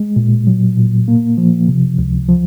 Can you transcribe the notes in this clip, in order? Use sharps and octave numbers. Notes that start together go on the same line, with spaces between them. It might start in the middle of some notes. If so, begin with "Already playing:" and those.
Already playing: G#3
A#2
F#3
A#2
A#3
F3
C3
C#2
F3